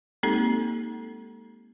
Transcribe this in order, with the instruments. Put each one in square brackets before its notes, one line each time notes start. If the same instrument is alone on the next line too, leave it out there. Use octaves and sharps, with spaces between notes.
[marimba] G#3 A#3 C4 D#4 G4 A4